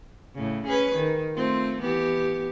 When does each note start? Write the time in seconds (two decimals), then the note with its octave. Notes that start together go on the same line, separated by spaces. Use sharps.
0.35 A2 C#3
0.66 C#4 G#4 B4
0.95 D#3
1.35 A3 C4 F4
1.82 E3 B3 G4